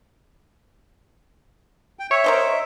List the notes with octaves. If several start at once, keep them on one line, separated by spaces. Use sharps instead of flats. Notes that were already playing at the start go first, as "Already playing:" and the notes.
G5
C#5 E5
A#4 C5 D#5